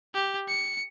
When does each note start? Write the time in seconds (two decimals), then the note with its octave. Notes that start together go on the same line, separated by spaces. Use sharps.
0.15 G4
0.48 C#7